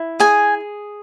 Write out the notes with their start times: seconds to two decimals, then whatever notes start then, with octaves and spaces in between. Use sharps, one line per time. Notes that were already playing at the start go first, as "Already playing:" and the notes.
Already playing: E4
0.20 G#4 G#5